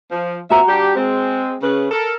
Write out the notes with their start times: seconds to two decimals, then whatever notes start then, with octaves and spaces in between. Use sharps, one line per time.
0.12 F3
0.50 A#2 C4 F#4 E5 A#5
0.68 G3 D4 G4
0.96 G#3 C4
1.63 C#3 B4
1.91 A4 A#4